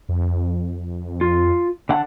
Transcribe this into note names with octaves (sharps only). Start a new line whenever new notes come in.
F2
F4
D3 F#5 A5